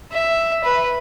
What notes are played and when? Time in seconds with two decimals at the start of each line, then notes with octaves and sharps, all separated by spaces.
0.12 E5
0.64 B4